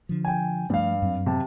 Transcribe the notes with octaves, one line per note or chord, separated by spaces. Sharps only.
D3 F3
G5 G#5
G2 F3 G3 A3 F5
F#2 F#3 C4
C3 A5